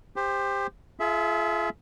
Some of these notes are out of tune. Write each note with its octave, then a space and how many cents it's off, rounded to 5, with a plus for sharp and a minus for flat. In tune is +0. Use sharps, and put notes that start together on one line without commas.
G4 +25 C5 +0
F4 -25 G#4 +40 E5 +0